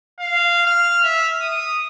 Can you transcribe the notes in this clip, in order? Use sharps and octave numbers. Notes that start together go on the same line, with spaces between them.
F5
F6
E5
D#6